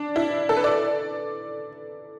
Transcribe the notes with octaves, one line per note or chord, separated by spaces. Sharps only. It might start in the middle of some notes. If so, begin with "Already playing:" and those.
Already playing: D4
E4
A4
B4
D5